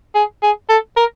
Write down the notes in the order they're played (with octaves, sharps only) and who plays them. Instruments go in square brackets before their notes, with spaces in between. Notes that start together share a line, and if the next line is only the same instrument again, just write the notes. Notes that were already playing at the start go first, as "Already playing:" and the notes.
[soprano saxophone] G#4
G#4
A4
A#4